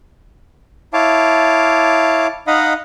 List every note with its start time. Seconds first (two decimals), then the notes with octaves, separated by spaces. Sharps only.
0.93 E4 C#5 F5 A5 D6
2.47 D#4 D#5 F5 F#5 B5 D#6